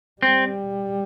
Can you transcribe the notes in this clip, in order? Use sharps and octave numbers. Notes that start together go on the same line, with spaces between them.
G3 C4